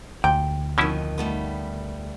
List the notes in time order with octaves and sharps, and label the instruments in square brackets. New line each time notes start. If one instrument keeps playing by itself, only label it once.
[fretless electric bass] D2 [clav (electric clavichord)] A#2 [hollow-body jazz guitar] G5
[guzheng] F2 D#3 [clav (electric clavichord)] B2 C#4 E4
[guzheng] G3 A3 B3